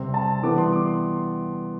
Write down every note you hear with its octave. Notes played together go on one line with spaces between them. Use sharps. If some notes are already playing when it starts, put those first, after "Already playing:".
Already playing: C3 G3 C4
A5
E3 G3 B3 D6
C6
D6
C6